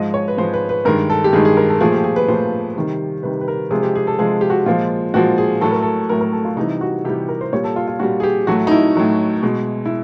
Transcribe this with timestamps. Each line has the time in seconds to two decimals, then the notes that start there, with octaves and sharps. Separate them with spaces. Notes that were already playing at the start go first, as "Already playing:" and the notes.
Already playing: G#2 F3 G#3 D#5
0.14 C#5
0.28 B4
0.38 G#2 F3 G#3 C5
0.54 B4
0.69 B4
0.85 G2 D#3 G#3 A#4
1.10 A4
1.24 G4
1.33 G2 D#3 G#3 G#4
1.45 G#4
1.57 A#4
1.69 A4
1.80 A#2 F3 A3 G#4
1.92 G4
2.04 G#4
2.16 B4
2.28 A#2 F3 A3 C5
2.76 C3 D#3 G3
3.23 C3 D#3 G3 B4
3.41 B4
3.48 A#4
3.71 C3 F3 G#3 G#4
3.83 G4
3.95 G#4
4.07 A4
4.19 C3 F3 G#3 G#4
4.41 G4
4.50 F#4
4.66 A#2 F3 G#3 F4
5.14 A#2 F3 G#3 F#4
5.38 G#4
5.61 A2 F#3 A3 A4
5.72 A#4
5.82 A4
6.09 A2 F#3 A3 A#4
6.21 A#4
6.32 A4
6.45 F4
6.56 C3 E3 G3 D#4
6.81 F#4
7.05 C3 E3 G3 G4
7.28 A#4
7.41 C5
7.52 A#2 G3 C#5
7.64 A4
7.76 F4
7.87 F4
7.99 A#2 G3 F#4
8.20 G#4
8.23 G4
8.47 A2 F#3 A3 F#4
8.67 D#4
8.71 E4
8.95 A2 F#3 A3
9.43 B2 G#3
9.86 E4